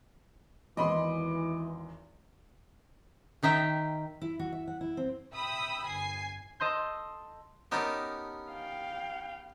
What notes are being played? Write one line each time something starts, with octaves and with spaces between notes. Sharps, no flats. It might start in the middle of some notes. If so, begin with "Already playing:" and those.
G#1 E2 E3 D#5 B5 C6 D6
D#3 D#4 E5 G5
E4
F#4
E5
F#5
E4
C4
E5 G5 B5 D#6 E6
G1 G#5 C7
A4 D#5 C6 G6
B3 C#4 D#4 G4 A4 A#4
F5 G5